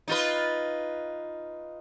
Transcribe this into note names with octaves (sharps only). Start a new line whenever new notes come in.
D#4 F4 B4